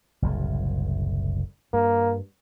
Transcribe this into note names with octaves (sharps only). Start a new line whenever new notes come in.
F#1 C2 A2
G2 A#3